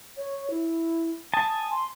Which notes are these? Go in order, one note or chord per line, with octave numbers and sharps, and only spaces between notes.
C#5
E4
G#5 A5 D#6
C6